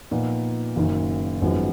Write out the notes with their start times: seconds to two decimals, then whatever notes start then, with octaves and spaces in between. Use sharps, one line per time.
0.11 A#2 F3 B3 D#4
0.76 F#1 F#2 D#3
1.42 G#1 F#2 F3 G#3 B3